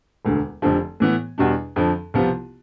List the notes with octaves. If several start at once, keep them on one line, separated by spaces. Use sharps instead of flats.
E1 D2 D3
F1 F2 D3 F3
A2 E3 B3
E2 B2 G3 D4
F2 D3 F3
C2 C3 F3 B3 F4